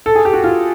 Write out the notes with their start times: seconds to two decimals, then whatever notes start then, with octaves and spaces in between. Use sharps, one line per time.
0.06 A4
0.15 G#4
0.25 G4
0.34 F#4
0.44 F4